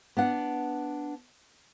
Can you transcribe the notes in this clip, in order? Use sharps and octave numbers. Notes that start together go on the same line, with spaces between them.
B3 D4 F#5